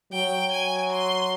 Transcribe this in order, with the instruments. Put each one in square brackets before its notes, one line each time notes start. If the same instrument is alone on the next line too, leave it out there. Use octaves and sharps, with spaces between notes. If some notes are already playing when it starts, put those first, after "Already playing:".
[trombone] F#3 [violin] G5
[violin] G#5
C6